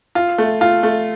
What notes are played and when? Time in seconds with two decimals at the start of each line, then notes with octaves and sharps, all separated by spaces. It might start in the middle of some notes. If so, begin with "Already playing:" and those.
0.15 F4
0.38 A3
0.61 F4
0.83 A3